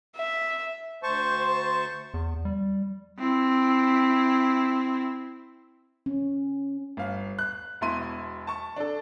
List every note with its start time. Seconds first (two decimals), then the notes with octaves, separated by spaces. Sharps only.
0.16 E5
1.03 D2 C5 A5 C#6
2.14 E2
2.45 G3
3.19 C4 E4
6.06 C#4
6.97 G1 F5
7.39 F#6
7.81 E1 B2 E4 C6 D#7
8.47 A5 C#6
8.76 D4 A4